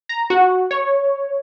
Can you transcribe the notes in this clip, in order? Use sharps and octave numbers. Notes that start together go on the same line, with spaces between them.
A#5
F#4
C#5